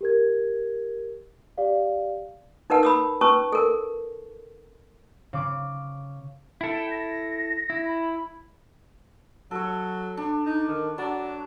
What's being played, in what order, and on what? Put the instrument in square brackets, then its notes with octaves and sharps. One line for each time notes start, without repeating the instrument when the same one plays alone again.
[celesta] G4 A#4 G#6
G4 D5 F5
[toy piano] D#4 A#4 B4 F#5 A5
B5 D#6 E6
C#4 B4 A5 C#6 D#6
A4 A#4
[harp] C#3 D6
[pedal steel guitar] E4 A4 [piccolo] G5
[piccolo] A#6
[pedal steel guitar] E4
[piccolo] B5
[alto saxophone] F#3 [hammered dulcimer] A4 C#5
[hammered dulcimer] D4
[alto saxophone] D#4
D#3
[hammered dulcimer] F#3 [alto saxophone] D4